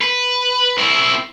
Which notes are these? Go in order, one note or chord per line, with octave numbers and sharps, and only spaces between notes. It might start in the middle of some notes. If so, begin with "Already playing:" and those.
B4
C4 E4